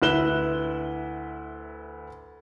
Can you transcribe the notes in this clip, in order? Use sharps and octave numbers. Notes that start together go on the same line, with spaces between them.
D2 E4 B4 F#6 E7 G7